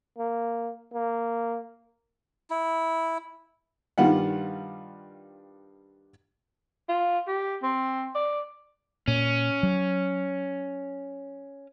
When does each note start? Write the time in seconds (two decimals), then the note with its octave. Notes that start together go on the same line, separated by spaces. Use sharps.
0.18 A#3
0.94 A#3
2.50 E4
3.98 G2 D#3 G3 F4 F#5
6.88 F4
7.27 G4
7.63 C4
8.15 D5
9.08 A#2 C#4
9.63 F#3